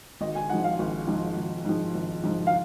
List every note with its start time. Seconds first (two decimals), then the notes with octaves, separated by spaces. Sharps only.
0.21 G#1 D#5
0.35 G#5
0.49 G#2 F3 F#5
0.64 F5
0.79 G#1
1.07 G#2 F3
1.37 G#1
1.65 G#2 F3
1.95 G#1
2.24 G#2 F3
2.47 F5